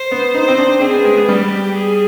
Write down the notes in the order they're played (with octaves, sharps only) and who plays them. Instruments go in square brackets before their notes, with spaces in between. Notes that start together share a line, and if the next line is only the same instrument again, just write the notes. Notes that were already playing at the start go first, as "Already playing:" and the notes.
Already playing: [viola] C5
[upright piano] B3
[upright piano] D#4 [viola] C5
[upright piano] C4
D4
[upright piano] C4 [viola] G#4
[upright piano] B3
G#3
B3
[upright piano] G3 [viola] G4
[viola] G#4